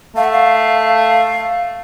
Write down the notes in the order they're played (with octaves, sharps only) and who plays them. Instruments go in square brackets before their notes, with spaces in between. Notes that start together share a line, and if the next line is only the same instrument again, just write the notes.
[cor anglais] A3 [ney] F5
[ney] F#5
F5
F5